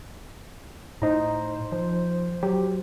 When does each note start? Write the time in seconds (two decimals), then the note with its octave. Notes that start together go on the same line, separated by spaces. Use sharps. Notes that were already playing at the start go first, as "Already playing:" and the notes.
1.02 A2 D#4 C5 A#5
1.72 F3
2.43 F#3 G4